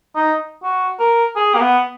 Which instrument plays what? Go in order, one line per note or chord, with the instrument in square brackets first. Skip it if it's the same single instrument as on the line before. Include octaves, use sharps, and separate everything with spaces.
[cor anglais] D#4
F#4
A#4
G#4
A#3
B3